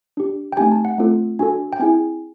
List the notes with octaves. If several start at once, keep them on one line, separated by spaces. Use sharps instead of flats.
D4 G4
G5
A3 C4 D#4 G4 G#5
A5
F#5
A3 C4 F4 A4
D4 F#4 A4 G#5
G5
C4 E4 G#4 G#5